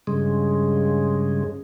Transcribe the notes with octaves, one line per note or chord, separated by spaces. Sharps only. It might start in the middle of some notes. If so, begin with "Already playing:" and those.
G2 C#3 G#3